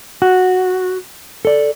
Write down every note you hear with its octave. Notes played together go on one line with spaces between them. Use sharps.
F#4
A4 D5